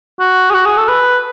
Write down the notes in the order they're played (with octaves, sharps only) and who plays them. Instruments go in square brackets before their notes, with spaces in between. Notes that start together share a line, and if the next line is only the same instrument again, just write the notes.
[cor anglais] F#4
G#4
F#4
G#4
A4
B4